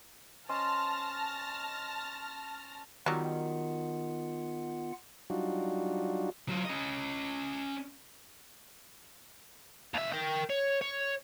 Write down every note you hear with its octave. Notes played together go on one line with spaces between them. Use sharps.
C#4 C5 D#5 A5 F6 A#6
D#3 F#3 G3 B3 F4 F#5
F#3 G3 D4 D#4 F4 F#4
F#3 F4
C#4 D#5
D#2 E5
A#4 G5
C#5
C#5